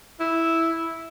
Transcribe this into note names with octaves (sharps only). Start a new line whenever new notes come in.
E4